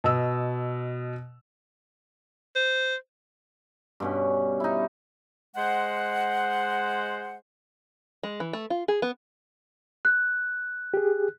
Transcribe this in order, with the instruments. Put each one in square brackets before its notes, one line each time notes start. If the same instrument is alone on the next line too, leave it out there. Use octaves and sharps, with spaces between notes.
[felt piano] B2 D#5 E6
[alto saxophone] C5
[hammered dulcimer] G2 B2 C#4
D#4 E4
[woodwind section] G#3 C5 F#5
[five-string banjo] G#3
E3
A3
F4
G#4
B3
[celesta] F#6
[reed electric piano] G4 G#4